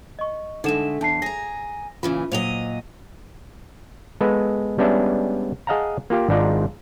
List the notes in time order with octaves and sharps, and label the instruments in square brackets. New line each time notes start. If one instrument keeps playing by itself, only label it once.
[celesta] D#5 C#6
[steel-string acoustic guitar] D3 G#3 A3 [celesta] D#4 A4 E7
[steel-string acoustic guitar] E2 [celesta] D4 A5 C7
[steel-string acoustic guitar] G#4 A#5 [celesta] A#6
[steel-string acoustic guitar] A#2 C#3 E3 [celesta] F4
[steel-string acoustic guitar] A#2 F#3 D#5 [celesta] C5 F7
[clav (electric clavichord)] G#3 B3 A4 B4
G3 G#3 B3 C#4 D4 E5
G#4 D#5 F5 F#5 A5 A#5
A#3 F4 G4 F5
G#1 G#2 D4 D#4 F4 D5